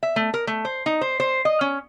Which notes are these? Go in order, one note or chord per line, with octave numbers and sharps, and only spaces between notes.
E5
A3
A#4
A3
C5
D#4
C5
C5
D#5
C#4